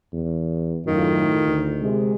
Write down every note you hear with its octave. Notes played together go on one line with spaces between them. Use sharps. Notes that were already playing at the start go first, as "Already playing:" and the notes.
E2
F#2 A2 D#3 F4
D2
C3 G#3